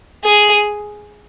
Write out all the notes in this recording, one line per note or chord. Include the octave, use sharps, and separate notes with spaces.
G#4